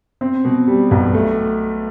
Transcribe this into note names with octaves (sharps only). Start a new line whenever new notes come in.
C4
B2
G3
B1
A3